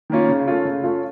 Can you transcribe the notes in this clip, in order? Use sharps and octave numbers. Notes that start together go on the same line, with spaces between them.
D#3 A#3 C#4 F4
C#3
A3 C#4 F4
C#3
A3 C#4 F4